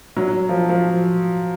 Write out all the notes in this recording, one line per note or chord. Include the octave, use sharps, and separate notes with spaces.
F#3
F3
F3